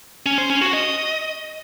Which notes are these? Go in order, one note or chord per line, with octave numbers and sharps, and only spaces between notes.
C#4
C5
C#4
F#4
D#5